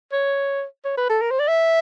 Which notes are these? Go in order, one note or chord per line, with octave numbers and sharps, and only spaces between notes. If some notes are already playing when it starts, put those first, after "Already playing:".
C#5
C#5
B4
A4
A#4
C5
D5
E5